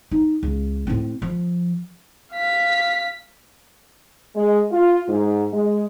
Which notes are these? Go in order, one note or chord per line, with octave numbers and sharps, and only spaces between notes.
D#4
C#2
A2 C4
F3
F5 B6
G#3
F4
G#2
G#3